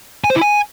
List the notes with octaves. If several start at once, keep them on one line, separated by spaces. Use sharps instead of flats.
G#5
C5
E4
G#5